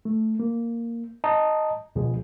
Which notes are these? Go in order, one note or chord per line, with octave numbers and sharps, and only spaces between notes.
A3
A#3
D#5 A5 A#5 D#6
C#2 B2 F3 G#4